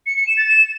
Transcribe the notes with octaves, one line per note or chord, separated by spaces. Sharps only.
C#7
C#7
E7
A6
E7